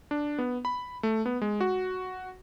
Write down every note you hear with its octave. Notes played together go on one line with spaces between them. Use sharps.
D4
B3
B5
A3
B3
G#3
F#4